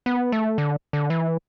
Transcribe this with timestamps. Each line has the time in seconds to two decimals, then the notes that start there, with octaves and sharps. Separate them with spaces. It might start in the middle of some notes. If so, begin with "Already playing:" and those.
0.06 B3
0.32 A3
0.58 D3
0.93 D3
1.10 E3